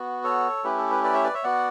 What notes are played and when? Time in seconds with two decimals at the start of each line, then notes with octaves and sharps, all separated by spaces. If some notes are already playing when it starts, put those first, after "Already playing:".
Already playing: B3 F#4
0.24 A4 C#5
0.64 A3 C#4 E4 G4 B4
0.77 A4
0.91 B4
1.04 B4 D5
1.14 C#5 E5
1.24 B4 D5
1.34 C#5 E5
1.44 B3 F#4 D5 F#5